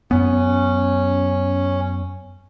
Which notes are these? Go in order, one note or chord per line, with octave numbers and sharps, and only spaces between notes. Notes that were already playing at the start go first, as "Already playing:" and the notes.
F#2 B3 C#4